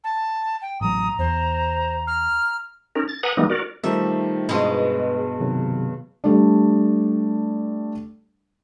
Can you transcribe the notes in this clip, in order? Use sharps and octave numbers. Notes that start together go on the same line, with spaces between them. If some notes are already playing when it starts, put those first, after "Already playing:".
A5
G5
A1 F#3 A#5 D#6
E2 C5
F6
C#4 D#4 A#4
A6
B4 F#5 G#5 A#5 D#6
E3 G3 G#3 A#3 B3 D#4
F#4 A#4 D5
D#3 G3 A3 D#4 F4 C5 E5
G2 B2 G#3 B3
C3 D#3 F#3
G3 A3 D4